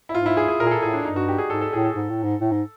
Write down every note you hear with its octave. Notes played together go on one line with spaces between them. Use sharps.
E4
G#2 F4
E4
G#4
G#4
A#2 A#4
G#4
A4
A2 G#4
D4
G2 D#4
F#4
G4
G#4
G#2 A4
A4
A2 G#4
A4
G#2
A2
G#2
A2
G#2